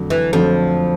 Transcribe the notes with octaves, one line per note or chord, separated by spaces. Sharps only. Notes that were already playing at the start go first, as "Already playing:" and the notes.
Already playing: F2 D3 F#3 A3
E3
F2 D3 F3 F#3 A3